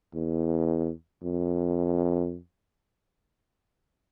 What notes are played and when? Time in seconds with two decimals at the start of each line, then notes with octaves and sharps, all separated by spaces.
0.14 E2
1.23 F2